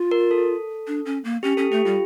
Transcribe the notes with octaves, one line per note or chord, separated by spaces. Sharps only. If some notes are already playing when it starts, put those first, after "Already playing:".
Already playing: F4
A#4
A4
D4
C#4
A#3
C#4 G4
C#4 A4
A3 G4
G3 F4